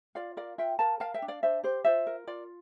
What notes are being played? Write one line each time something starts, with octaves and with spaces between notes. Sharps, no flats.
F4 D5 F5
A#4 D5 F5
F4 E5 G5
A#4 F5 A5
A#4 F5 A5
E5 G5
D4
D5 F5
D4 C5 E5
G4 C5
F4 C5 E5
A#4
F4 D5